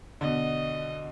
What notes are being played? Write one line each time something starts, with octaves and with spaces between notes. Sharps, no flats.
B2 D3 D#5